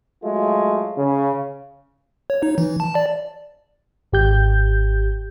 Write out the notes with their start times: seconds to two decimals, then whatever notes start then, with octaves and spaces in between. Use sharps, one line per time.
0.24 F#3 G#3 A3 F4
0.98 C#3
2.30 C#5
2.43 D#4
2.58 E3
2.80 A5
2.95 D5
4.12 G#1 G4 G6